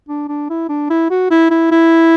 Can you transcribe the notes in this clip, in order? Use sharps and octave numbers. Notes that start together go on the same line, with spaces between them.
D4
D4
E4
D4
E4
F#4
E4
E4
E4